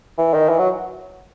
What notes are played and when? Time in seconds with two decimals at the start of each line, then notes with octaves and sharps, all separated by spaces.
0.18 E3
0.34 D#3
0.49 E3
0.59 F#3